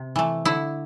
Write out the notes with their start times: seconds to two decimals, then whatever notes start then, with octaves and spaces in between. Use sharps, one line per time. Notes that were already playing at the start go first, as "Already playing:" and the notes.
Already playing: C3
0.16 E3 A3
0.45 D3 E4